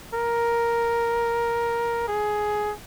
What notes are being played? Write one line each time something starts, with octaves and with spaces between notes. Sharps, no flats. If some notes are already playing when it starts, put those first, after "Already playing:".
A#4
G#4